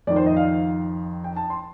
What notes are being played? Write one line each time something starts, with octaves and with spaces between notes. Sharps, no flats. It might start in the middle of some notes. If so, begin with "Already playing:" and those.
F2 D#3 D5
C5
D#5
F5
G5
A5
C6